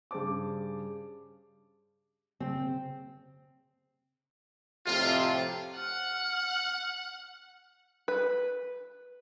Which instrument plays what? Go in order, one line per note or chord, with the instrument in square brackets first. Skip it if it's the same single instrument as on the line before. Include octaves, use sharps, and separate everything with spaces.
[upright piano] G2 C#3 G#4 C5 A5 D6
[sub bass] C#3 [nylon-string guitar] C4
[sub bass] C#3
[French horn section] F2 A2 C3 [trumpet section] F4
[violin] F#5 [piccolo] F6
[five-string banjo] B4